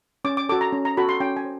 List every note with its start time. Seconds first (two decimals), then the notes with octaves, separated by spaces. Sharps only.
0.25 C#4 D6
0.37 D6
0.49 F#4 A4 D6
0.61 A#5
0.72 C#4
0.85 A#5
0.97 F#4 A4 B5
1.09 C6
1.20 C#4 G5
1.36 G#5
1.44 C5